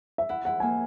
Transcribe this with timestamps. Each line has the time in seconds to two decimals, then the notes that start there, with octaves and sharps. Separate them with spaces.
0.18 E5
0.29 E4 F#5
0.45 E4 F#5
0.60 A#3 G#5